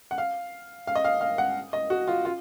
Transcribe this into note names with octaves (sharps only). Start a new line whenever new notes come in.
F#5
F5
F5
D#5
F5
F5
F#5
D#5
F#4
F4
F4